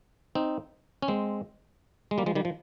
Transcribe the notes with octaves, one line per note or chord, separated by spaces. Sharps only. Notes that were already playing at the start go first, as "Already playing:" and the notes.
C4 D#4
C#4
G#3 C4
G#3
G3 A#3
F3 G#3
D#3 G3
F3